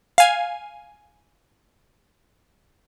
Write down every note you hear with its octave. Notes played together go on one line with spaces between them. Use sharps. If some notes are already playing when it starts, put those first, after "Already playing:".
F5 G#5